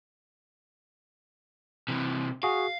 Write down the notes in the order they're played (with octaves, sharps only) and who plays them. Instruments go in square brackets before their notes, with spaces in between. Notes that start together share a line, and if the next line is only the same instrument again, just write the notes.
[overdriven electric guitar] C3 E3
[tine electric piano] F#4 G#4 [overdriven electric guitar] F5